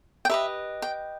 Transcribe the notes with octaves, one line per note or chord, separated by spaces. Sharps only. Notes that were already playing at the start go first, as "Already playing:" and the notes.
G5
G4 B4 D#5 E5
G5